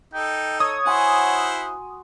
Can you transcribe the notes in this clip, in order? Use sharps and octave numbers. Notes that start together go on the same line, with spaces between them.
D#4 A4 G5
C#5 D#6
E4 F#4 C5 F#5 G#5 C6